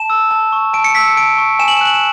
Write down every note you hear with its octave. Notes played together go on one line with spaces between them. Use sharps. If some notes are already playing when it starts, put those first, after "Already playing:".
Already playing: A5 E7
E6
A5
C#6
A5 D7
C#7
E6 B6
C#7
A5 D7
C#6
G#5 E7
F#7
E7
F#6 F#7
E7